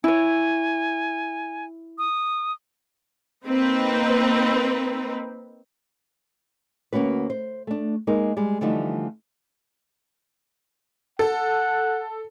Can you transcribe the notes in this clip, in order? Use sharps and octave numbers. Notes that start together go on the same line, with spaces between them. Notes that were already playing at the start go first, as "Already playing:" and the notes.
E4 C#5 G#5
D#6
A#3 C4 D#4 B4
D2 A#3 C#4 F#4 B4
C5
A3 D4
G#3 A#3 D#4 A#4
G3 G#3
D3 E3 F3 G3 A3 D#4
A4 F#5